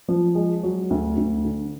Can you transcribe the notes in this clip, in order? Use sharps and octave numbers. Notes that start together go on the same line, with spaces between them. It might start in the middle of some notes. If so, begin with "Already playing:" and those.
F3
G#3
F#3
D2
D2
D3